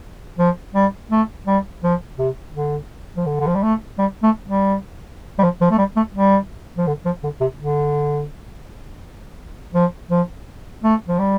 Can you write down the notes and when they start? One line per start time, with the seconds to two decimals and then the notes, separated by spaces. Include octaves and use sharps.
0.39 F3
0.74 G3
1.11 A3
1.47 G3
1.83 F3
2.18 C3
2.55 D3
3.17 F3
3.26 D3
3.40 D3
3.47 F3
3.55 G3
3.63 A3
3.98 G3
4.23 A3
4.46 G3
5.39 G3
5.43 F3
5.61 F3
5.71 A3
5.78 G3
5.96 A3
6.15 G3
6.77 F3
6.87 D3
7.05 F3
7.23 D3
7.40 C3
7.59 D3
9.74 F3
10.10 F3
10.83 A3
11.08 F3
11.19 G3